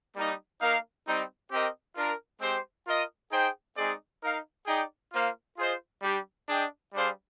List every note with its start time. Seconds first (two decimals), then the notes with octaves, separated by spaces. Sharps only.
0.16 G3 A#3 D#4
0.61 A#3 D#4 A#4 F5
1.06 G3 C4 D#4
1.51 C4 G4 A#4 D#5
1.96 D4 F4 A#4
2.41 G#3 C4 G4 C5
2.86 F4 A#4 D#5
3.31 D#4 G#4 C5 G5
3.77 G#3 C4 D#4 G#4 D5
4.22 D#4 A#4 F5
4.67 D#4 G#4 D5 G5
5.12 A#3 F4 C5 F5
5.57 F4 G#4 C5 D#5
6.02 G3 D4 G4
6.48 D4 G#4 D#5 G5
6.93 G3 D4 G#4 C5 F5